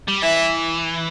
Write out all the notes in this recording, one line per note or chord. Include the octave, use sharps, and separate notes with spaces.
G3
E3 E5